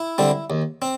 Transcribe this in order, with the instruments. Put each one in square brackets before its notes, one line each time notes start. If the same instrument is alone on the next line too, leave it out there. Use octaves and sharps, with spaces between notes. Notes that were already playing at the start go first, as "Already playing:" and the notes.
Already playing: [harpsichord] E4
D3 G3 C4
D#2
C4